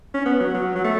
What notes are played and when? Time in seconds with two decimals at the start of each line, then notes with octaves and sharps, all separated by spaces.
0.14 C#4
0.26 B3
0.40 F#3
0.54 F#3
0.76 F#3
0.84 A3